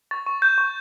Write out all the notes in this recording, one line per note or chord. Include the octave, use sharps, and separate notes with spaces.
C#6 A6
C#6
G6
C#6